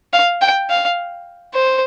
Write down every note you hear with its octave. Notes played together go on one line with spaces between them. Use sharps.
F5
G5
F5
C5